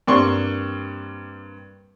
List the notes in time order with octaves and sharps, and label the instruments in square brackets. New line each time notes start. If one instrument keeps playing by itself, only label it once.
[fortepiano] G2 A#3 C4 D5 C6 C#6